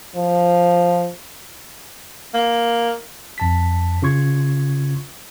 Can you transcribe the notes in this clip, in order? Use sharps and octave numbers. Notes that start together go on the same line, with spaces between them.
F3
A#3
F2 A5 B6
C#3 C#4 F4 C6 C#6 G#6